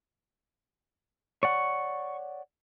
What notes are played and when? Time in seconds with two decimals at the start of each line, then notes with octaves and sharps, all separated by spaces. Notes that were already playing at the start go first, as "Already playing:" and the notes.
1.43 C#5 D5 F#5 C#6